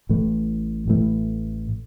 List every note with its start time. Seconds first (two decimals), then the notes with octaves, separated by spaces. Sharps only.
0.09 A1 A2 E3 A3
0.88 A1 A2 E3 A3